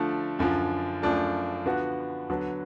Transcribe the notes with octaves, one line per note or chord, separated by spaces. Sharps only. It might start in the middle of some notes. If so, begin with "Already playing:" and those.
Already playing: D3 F3 A3
F#2 D3 F3
F#2 F3 A3 D4 F4
D3 F3 B3 F#4
D3 F#3 B3